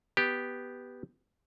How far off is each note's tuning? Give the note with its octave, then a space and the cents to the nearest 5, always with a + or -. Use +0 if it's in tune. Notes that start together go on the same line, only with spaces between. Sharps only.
B3 +0 G4 +0